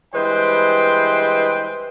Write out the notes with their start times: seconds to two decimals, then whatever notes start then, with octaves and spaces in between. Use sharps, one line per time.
0.15 G2 E3 G#3 B4 C5 G5